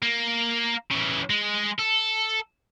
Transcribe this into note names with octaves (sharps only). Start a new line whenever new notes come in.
A#3
C#3 E3
G#3
A4